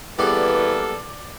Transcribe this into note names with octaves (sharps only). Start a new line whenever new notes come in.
E3 G3 A#3 B3 G#4 A4 D5